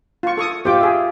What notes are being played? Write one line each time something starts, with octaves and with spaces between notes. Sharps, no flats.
F4 C#6
A4 C#6 D#6
F4 G4 C5 G5 D6
G#4 E5